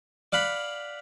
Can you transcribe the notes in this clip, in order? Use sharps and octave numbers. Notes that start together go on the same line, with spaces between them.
D5 F5 F#5 B5